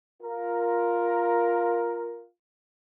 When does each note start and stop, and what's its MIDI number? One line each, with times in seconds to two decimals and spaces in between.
0.23 2.26 65
0.23 2.26 70